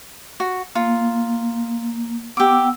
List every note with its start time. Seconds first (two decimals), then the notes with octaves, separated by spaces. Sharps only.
0.40 F#4
0.75 A#3 F4
2.37 B3 G4 F#5 D6 E6